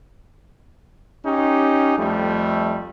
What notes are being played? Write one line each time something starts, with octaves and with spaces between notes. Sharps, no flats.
C#4 D#4 G4
F2 G3 A3